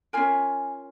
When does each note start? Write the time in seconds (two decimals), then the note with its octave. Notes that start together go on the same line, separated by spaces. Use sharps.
0.13 C#4 F4 A#4 G#5